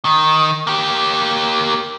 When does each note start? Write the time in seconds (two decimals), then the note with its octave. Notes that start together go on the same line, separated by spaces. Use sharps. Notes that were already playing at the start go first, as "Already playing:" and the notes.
0.05 D#3
0.67 A#3 G4